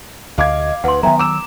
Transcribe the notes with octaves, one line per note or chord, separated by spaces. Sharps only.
D2 D#5 F5 D6 G#6
D2 B4 F#5 C6
D#3 F#3 B3 E5 G5 G#5 A#5
D6 E6 E7